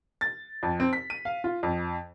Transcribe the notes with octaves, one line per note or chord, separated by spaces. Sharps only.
A6
F2
C4
B6
D#7
F5
F4
F2